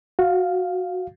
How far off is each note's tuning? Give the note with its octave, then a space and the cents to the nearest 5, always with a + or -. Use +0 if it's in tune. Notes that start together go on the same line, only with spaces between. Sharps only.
F#4 -10 F5 +0